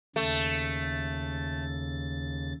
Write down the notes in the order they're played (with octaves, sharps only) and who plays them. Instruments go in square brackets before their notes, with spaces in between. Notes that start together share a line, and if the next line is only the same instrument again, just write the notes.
[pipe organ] D#2 C#3 A6 [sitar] A3